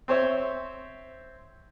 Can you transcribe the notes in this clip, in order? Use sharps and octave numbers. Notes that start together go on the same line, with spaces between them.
C4 C5 C#5 E5